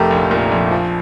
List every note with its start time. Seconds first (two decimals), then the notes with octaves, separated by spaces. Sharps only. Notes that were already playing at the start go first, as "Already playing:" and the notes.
Already playing: F1 A3 G4 A#4
0.10 A#1
0.31 A#2
0.51 A#1
0.71 F3